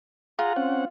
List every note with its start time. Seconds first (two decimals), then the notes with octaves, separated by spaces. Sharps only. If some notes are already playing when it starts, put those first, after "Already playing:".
0.39 F4 G#4 F#5 A#5
0.56 C4 C#4 F#5